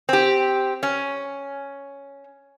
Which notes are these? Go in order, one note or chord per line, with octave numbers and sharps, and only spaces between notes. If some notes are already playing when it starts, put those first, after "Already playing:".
C4 G4
C#4